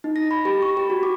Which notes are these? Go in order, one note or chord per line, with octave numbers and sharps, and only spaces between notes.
D#4
A#6
B5
G4
C#6
G4
F#4
D6